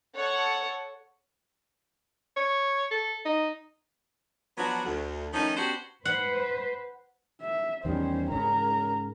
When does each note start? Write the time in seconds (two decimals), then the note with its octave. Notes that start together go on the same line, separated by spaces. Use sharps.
0.16 A4 C#5 F#5
2.37 C#5
2.91 A4
3.26 D#4
4.58 F3 F#3 B3 D4 F#4
4.86 D2
5.33 D#3 F3 A3 C#4 D#4
5.56 B3 C#4 D4 F#4 G4 C5
6.05 B4 C5 F#5
7.41 E5
7.85 E2 D#3 G3 C#4 C5
8.32 G#2 C#3 C#4 A#4 A#5